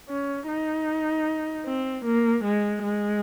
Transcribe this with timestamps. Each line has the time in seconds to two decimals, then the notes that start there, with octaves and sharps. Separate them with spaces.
0.09 C#4
0.48 D#4
1.66 C4
2.05 A#3
2.44 G#3
2.83 G#3